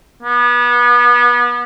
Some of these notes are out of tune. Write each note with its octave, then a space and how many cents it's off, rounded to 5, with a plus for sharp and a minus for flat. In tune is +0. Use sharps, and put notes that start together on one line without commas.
B3 -30